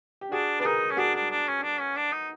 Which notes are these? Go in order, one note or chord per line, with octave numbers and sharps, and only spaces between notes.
G4
D4 F#4 G#4
D4 B4
D#4 G#4 A#4
C#4
D4 F#4 G#4
D4
D4
C#4
D4
C#4
D4
D#4